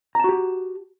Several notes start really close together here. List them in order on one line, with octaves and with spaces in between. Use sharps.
A#5 A5 F#4 G4